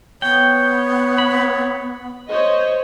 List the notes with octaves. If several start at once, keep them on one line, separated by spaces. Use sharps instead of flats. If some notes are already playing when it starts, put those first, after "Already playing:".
B3 C#5 G5
B5
C5 C#5 D#5